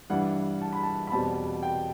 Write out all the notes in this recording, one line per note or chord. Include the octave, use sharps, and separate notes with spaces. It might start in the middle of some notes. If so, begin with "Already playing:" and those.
G2 E3 G3 D4 F#5
A5
B5
A5
B5
E2 B2 G3 C4 A5
G5